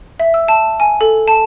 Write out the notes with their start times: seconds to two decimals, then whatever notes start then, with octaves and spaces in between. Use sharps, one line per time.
0.20 E5
0.34 E6
0.48 A5
0.80 G#5
1.01 A4
1.28 A5